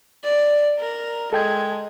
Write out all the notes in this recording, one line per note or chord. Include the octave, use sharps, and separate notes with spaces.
D5
A#4
G#3 A4 G5 G#6